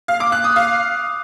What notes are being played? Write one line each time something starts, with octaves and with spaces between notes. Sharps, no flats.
F5
D6
F#6
D#6
F5